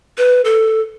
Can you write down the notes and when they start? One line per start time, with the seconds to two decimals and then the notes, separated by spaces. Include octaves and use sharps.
0.18 B4
0.45 A4